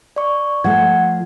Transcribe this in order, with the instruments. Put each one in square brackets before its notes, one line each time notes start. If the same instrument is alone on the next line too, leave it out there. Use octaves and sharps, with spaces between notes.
[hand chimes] D5 C#6
[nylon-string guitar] F3 A3 [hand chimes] F#5 G#6